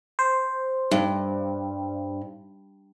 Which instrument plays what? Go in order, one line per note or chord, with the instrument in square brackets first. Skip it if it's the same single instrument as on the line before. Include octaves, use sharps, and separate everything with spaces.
[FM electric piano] C5
[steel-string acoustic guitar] G2